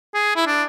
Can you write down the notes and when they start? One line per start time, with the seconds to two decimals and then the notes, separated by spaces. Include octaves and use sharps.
0.14 G#4
0.36 E4
0.46 D4